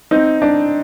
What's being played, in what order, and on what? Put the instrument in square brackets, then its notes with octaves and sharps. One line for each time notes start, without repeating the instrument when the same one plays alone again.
[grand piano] C4 D#4
D4